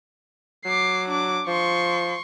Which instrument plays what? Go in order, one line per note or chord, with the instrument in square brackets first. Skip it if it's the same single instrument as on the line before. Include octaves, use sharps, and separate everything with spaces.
[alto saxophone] F#3 [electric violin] D6 C7
[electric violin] D4 D6
[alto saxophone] F3 [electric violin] C6 C#6